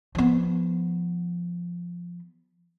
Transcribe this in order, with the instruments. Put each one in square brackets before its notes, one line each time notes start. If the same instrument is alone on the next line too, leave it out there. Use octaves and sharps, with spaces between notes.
[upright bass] F3 B3